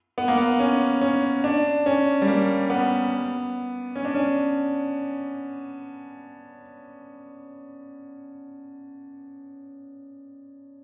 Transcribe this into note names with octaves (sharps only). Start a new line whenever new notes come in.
B3
A#3
B3
C#4
C#4
D4
C#4
G3
A#3
B3
C#4
D4
C#4